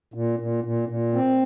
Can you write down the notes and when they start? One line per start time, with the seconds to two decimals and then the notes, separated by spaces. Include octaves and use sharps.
0.14 A#2
0.39 A#2
0.64 A#2
0.89 A#2
1.14 C4